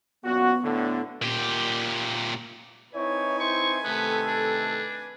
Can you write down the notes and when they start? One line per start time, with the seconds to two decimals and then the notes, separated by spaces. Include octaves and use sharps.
0.24 F#2 A#2 B3 F#4
0.63 A2 D3
1.22 A#2 G4
2.95 C4 D#4 E4 B4 C#5 G#5
3.40 C5 C#6
3.84 C3 D#3 A3 B3 A4
4.27 D4